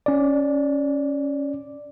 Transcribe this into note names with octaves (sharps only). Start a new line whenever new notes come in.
C#4 D5